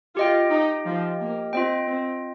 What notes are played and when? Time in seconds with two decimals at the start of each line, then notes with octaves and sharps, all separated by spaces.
0.16 F4 G4 D#5 G5
0.51 D#4
0.85 F3
1.19 A#3
1.53 C4 F4 D#5 G5
1.87 C4